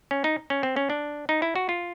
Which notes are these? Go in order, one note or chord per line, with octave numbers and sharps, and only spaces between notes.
C#4
D#4
C#4
C4
C#4
D4
D#4
E4
F#4
F4